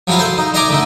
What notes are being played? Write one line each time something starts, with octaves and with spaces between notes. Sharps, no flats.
F3 F#3 G#3 E4 F4
A4 C5
D#4
D#4 D#5 E5 G#5 A#5 D6
D3 A3 D#4